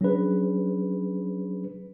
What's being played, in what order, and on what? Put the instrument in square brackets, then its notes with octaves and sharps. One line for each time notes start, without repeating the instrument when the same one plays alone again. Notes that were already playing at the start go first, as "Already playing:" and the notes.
[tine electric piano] F#3 C#4 D4 G#4 B4